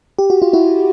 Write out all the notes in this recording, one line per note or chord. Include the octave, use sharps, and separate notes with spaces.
G4
F#4
F4
E4 F#4